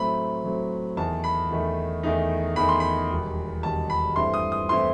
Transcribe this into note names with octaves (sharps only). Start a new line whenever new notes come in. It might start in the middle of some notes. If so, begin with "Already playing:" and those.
Already playing: A2 F#3 A3 C4 B5
A2 F#3 A3 C4
E2 D#3 A3 A5
B5
E2 D#3 A3
E2 D#3 A3 D#4
E2 D#3 A3 D#4 B5
C6
B5
E1 D#2 D#3 G3
E1 D#2 D#3 G3 A5
B5
G2 E3 A3 C4 E4 C6
D#6
D#6
E3 A3 C4 E4 C6